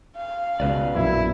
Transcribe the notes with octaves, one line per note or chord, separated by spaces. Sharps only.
F5
C#2 B2 B4 D5
A#1 F#2 E4